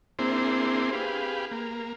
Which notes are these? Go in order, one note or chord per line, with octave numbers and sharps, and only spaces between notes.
A#3 C4 D4 E4 G#4 C5
G4 G#4 B4 F5
A#3